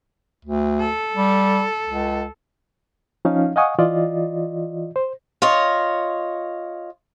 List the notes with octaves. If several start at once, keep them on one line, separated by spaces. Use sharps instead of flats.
D2
A4
G3
C#2
F3 C#4 D#4 F5
D#5 F5 F#5 G#5 C#6 D#6
E3 F4 D5 D#5
C5
F4 C#5 D#5